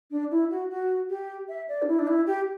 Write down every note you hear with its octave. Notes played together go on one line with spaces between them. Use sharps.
D4
E4
F#4
F#4
G4
E5
D5
D4
E4
D4
E4
G4